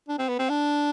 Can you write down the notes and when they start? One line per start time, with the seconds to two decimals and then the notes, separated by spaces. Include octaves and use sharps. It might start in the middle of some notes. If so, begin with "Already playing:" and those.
0.09 D4
0.18 C4
0.29 B3
0.39 C4
0.49 D4